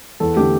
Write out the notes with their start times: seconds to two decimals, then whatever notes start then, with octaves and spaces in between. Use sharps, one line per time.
0.20 E2 A4
0.36 D3 A3 G4